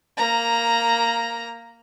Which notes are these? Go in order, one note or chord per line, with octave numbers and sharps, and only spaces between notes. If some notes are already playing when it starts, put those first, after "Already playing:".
A#3 A#5